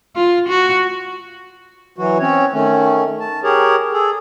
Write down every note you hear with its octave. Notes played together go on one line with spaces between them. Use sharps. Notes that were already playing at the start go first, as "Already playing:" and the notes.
F4
F#4
E3 F#3 F#4
C4 C#4 C#5
D#3 A3 C#4
A5
G4 G#4 A#4 C#5
G#4 A4